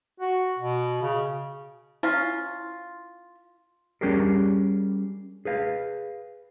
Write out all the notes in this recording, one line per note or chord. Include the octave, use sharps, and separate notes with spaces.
F#4
B2
C#3
C#4 E4 F4
G3 C#4 D4 G4 G#4 A#4
G#4 B4 F5